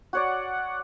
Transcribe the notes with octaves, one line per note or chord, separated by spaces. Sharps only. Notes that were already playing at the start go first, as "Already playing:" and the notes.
F#4 C#5 D5 F#5